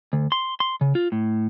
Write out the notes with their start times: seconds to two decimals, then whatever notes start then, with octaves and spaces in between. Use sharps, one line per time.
0.13 D2
0.32 C6
0.60 C6
0.81 C#3
0.95 F4
1.12 A2